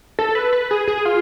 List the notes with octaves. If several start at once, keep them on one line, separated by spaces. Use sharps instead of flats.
A4
B4
B4
G#4
G#4
F4